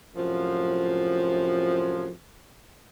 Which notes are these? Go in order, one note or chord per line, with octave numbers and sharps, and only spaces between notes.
F#2 A2 C3 F3